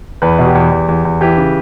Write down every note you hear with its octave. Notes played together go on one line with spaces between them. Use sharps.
E2 B4
B2
G4
E2
E2
E2
E2
E3 G4
C#3